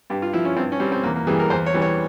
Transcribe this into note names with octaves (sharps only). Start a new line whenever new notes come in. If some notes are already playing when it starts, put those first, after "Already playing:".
G2 G4
F4
F3 E4
C#4
G2 C4
C#4
G3 C4
C4
E2 A#3
A#3
E3 G3 G#4
A#4
E2 C5
C#5
E3 G3
C#5